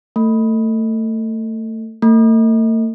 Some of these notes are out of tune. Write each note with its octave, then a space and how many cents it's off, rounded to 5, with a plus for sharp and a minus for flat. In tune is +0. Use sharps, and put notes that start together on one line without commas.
A3 +25
A3 +45